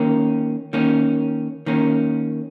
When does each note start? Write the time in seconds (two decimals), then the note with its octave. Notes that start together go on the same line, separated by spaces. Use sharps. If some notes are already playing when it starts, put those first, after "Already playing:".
Already playing: D#3 A#3 C#4
0.73 D#3 A#3 C#4
1.66 D#3 A#3 C#4